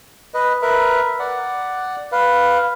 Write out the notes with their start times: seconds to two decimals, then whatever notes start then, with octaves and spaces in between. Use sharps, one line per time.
0.34 B4 D#5
0.62 A#4 B4 E5
1.20 D5 F#5
2.12 B4 F5